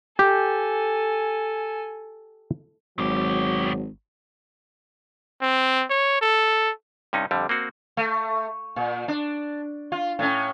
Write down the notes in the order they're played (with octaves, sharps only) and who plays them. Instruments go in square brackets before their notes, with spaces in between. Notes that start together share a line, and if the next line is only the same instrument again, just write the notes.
[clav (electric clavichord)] G4 [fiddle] A4 G#5
[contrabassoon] G#1 [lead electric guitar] B2 G4 [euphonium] F#3
[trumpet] C4
C#5
A4
[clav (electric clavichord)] G2 C3 C#4 D#4
F2 D3 G3
A#3 C4 F#4
[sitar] A3
A#2
D4
F4
A2 C#4